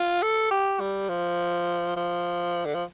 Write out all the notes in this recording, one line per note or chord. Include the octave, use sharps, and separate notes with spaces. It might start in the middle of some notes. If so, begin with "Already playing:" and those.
Already playing: F4
A4
G4
G3
F3
F3
D3
F3